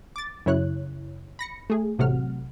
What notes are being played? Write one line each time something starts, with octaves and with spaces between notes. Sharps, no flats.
D6 A6
F#2 C#3 E4 C#5 F#6
B5 A#6 C#7
A3 G#4
A1 C3 F#3 A3 F#5 F6